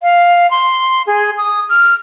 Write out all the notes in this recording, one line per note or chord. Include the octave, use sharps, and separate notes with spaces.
F5
C6
G#4
D#6
F6